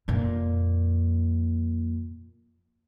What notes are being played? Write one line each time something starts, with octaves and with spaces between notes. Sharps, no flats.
F2 A#2